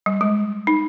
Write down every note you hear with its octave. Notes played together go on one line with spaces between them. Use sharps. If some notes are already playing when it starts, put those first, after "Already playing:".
G3
G#3
D#4